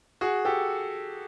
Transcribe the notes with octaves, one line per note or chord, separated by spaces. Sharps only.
F#4 G#4
G4 A4